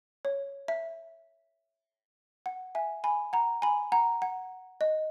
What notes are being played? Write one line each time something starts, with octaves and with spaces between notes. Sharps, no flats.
C#5
E5
F#5
E5 G#5
G#5 B5
F#5 A#5
G#5 B5
F#5 A#5
F#5
D#5